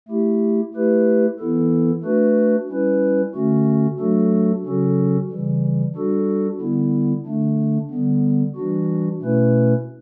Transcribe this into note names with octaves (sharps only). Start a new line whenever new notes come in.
A3 E4 G4
A3 E4 G4 B4
E3 B3 E4 A4
A3 D4 F#4 B4
G3 C#4 E4 B4
D3 A3 C#4 F#4
F#3 A3 D4 F#4 A4
C#3 F#3 C#4 F#4 A4
C#3 E3 G3
G3 D4 F#4 A4
D3 G3 B3 E4
D3 A3 D4
D3 G3 B3
E3 G3 D4 F#4
B2 A3 C#4 E4 B4